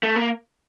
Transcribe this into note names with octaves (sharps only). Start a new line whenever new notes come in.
A3
A#3